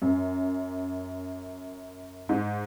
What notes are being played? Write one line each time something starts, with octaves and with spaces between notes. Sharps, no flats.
F#2
G#2